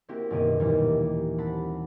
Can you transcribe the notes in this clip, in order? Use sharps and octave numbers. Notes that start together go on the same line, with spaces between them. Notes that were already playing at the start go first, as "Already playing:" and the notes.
A#3 C4 E4 F#4 G4
F#1 B2 D#3 A#3 G4 D#6
D#2 A#2 E3 G3 D#4
C4 F#5 A5 B5